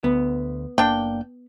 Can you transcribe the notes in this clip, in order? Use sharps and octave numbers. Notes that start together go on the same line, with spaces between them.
D2 B3
F#1 A#3 D4 G5